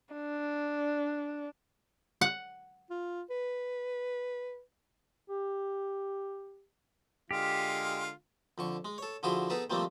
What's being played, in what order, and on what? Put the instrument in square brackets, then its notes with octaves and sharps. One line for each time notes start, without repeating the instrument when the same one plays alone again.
[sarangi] D4
[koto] F#5
[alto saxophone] F4
B4
[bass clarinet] G4
[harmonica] D3 G#3 F4 [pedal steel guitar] G4
[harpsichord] F2 D3 C#6
G#3
A4 C#5
D3 F3 E4 F#4 G#4 C6
B3 D#4 G#4 A4 B4
D#3 F3 G3 A3 A#3 C4